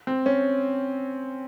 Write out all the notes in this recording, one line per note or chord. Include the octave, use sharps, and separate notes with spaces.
C4
C#4